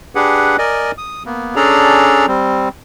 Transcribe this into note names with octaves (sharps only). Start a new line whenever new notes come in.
D4 G4 G#4 B4 F#5
A#4 D5 D#5 G#5
D#6
A#3 B3
C#4 D4 G#4 A4 D5 A#5
G3 C4